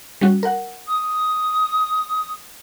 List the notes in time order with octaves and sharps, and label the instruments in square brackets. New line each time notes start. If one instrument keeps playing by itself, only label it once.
[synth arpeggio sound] G3 C#4 F#4
A#4 F#5
[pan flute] D#6